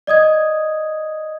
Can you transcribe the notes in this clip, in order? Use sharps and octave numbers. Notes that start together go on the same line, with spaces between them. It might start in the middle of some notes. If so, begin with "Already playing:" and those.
D5 D#5 D#6 G#6